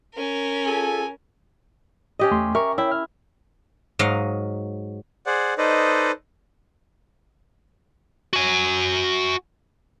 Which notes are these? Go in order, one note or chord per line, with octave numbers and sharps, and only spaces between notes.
C#4 A#4
F4 G#4 A4 G#5
C#4 G4 D#5
E2 A3 C6
A#4 E5 A#5 C#6
E4 C#5 E5 G5
F6
G#2 F#3 D#5 F5
G#4 C5 D5 F#5
D#4 A4 B4 C5 D5 D#5
F#4 G#5